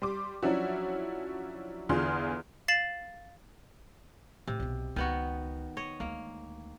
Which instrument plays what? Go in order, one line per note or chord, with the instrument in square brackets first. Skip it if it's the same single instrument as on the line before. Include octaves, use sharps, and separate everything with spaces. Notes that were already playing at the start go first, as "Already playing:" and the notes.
[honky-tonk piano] G3 C6 D6
F3 F#3 C#4 D4 E4 F#4
E2 D3 F4 G#4 C6 F6
[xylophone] F5 A6 C7 E7 F#7
[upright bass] A2 D#3 [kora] C3
[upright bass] B1 B2
[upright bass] C#2 [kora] D#3 B3 F#4
[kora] C#5 D#5
[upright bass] D2 G#3 [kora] A#3